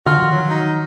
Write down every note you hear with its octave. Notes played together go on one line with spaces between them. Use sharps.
D3 F4 F#4 F6
D#3 F3
F#3
D#4